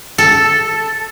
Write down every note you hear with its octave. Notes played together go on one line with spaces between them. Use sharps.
A4